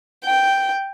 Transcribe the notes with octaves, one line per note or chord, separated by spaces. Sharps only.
G5